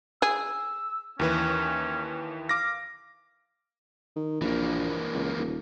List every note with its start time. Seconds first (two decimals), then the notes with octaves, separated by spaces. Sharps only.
0.22 G#4 E6
1.19 D#2 E3 C#4 B4
2.49 F5 D6 A#6
4.16 D#3
4.41 A#1 E3 A#3
5.13 C#2
5.38 D#1